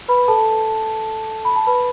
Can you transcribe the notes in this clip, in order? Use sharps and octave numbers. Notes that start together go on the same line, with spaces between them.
B4 B5
A4 A5
B5
A5
B4 B5